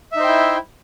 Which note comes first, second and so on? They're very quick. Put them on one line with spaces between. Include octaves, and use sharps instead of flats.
E5 D#4 C5 G5 E4